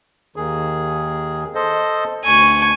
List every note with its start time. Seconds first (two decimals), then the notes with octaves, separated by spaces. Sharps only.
0.36 D#2 D#3 G#4
1.55 A4 C5 D#5
2.25 D2 G#5 C#6